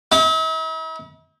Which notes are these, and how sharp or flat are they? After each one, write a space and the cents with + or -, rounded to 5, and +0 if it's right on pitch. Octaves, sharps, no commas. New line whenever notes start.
E4 -45